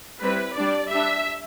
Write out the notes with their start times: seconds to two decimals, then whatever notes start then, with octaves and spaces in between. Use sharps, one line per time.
0.22 G3 C4 E4 B4
0.55 G3 D4 D5
0.90 G3 D4 E5